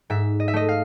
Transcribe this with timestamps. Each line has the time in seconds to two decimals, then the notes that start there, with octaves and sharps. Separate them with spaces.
0.10 G#2 E5
0.40 D#5
0.48 E5
0.54 A3 D#5
0.69 F5